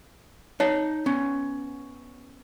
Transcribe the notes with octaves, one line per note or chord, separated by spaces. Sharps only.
D#4 C#5 A5
B3 C#4